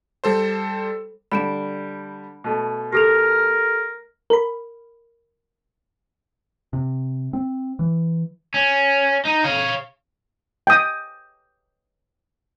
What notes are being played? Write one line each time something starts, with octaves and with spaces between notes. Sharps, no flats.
G3 A4 C5
D3 G3 B5 D7 E7
B2 A3
G4 A4 A#4 F7
A#4 B5
C3
C4
E3
C#4
D#4
C#5 F5
G5 D#6